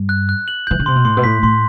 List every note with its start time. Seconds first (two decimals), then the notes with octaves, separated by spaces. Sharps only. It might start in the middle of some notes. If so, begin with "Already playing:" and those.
Already playing: G2
0.09 F#6
0.29 F#6
0.48 F#7
0.67 E3 G6
0.79 D3
0.86 C3 C6
0.96 B2
1.05 A2 C6
1.17 B2
1.24 A2 B6
1.43 A2 C6